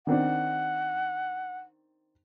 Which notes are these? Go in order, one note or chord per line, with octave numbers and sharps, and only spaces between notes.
D#3 C4 D4 F#5